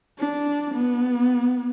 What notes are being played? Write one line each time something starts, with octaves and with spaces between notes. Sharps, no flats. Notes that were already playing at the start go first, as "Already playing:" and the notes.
D4
B3